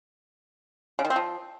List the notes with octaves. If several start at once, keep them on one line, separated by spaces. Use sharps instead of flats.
C#3
D#3
C4
F3